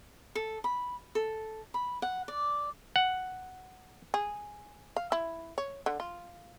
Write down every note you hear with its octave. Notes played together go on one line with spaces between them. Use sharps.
A4
B5
A4
B5
F#5
D5
F#5
G#4
F5
E4
C#5
D3
F4